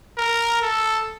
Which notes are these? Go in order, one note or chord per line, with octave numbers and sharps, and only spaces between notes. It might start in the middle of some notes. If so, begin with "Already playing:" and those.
A#4
A4